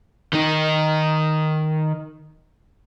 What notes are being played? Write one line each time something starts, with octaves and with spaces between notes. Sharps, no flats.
D#3 D#4